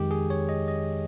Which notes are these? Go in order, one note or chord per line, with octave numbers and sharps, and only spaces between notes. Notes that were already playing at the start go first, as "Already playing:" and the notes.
Already playing: F2 D#3 G#3 G4
G#4
C#5
D#5
D#5